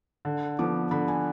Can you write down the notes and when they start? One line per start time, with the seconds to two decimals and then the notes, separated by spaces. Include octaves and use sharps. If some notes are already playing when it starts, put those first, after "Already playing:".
0.25 D3
0.59 F3 B3 D6
0.91 D3 B5
1.08 G#5